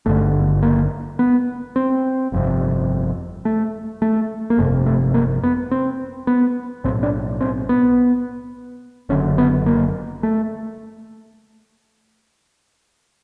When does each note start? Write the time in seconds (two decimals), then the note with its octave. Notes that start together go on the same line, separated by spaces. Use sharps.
0.06 G#1 G2 D3 A3
0.63 A#3
1.19 B3
1.76 C4
2.32 G1 F2 C3
3.45 A3
4.02 A3
4.50 A#3
4.58 G1 F2 C3 A3
4.86 A3
5.14 A#3
5.43 B3
5.71 C4
6.27 B3
6.84 B1 A2 C4
7.03 D4
7.41 C4
7.69 B3
9.09 F#1 F#2 D3 C#4
9.38 B3
9.66 A#3
10.23 A3